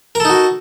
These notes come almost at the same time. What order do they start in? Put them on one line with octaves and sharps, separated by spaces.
A#4 A4 D#4 F#4